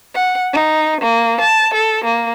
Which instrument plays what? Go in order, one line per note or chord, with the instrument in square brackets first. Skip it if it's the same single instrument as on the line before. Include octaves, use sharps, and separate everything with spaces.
[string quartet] F#5
D#4
A#3
A5
A4
A#3